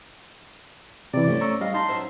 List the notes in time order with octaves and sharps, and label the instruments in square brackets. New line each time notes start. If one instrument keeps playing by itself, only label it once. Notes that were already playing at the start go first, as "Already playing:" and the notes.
[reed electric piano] C3 E3 [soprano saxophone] D5
[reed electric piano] G2 [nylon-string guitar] A3 C#4 C5
[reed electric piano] A#5 C#6 E6
[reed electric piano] G3 [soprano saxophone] D#5 [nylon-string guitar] F5
[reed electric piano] D#4 A5 A#5 [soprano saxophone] C6
[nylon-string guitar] F#2 C5 E5